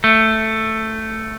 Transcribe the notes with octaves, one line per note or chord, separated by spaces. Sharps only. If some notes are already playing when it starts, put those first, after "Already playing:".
A3